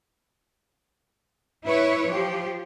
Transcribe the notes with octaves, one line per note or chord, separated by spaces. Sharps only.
E4 B4 C#5
F3 G4